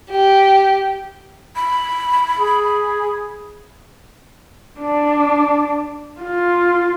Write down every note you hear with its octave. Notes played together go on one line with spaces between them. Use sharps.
G4
B5
G#4
D4
F4